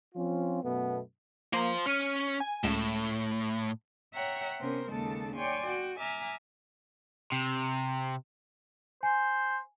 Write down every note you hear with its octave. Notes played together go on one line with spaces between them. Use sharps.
F3 C4 C#4 F4
F#2 B2 A3 B3
A#3 F4 C5
C#4 F6 C#7 D#7
G#5
C#2 A2 E7
C#5 E5 F#5 G5 A#5
C3 B3 C#4 A#4 C5
D#2 C#3 G#3 A#3 A4 A5
C#5 D5 G5 G#5 C6
F#4 G5
E5 G#5 A#5 D6 F6
C3
C5 G#5